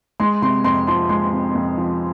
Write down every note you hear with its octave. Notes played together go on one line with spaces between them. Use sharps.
G#3 C6
C3 C6
F2 C6
F3 C6
G#3 C6
C3
F2
F3